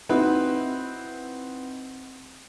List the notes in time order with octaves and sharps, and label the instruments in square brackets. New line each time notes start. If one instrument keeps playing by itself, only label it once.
[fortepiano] C4 D#4 E4 F#4 B4